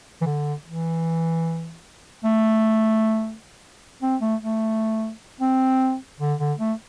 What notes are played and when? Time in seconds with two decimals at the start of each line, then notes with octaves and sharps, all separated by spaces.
0.21 E3
0.26 D3
0.66 E3
2.24 A3
4.02 C4
4.21 A3
4.42 A3
5.41 C4
6.20 D3
6.39 D3
6.59 A3